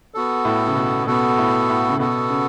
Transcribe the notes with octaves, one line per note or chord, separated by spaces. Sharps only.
B3 F#4 A4
A2
C#3
B2
B2 B3 F#4 A4
A2
A2
C#3
B2 B3 F#4 A4
C#3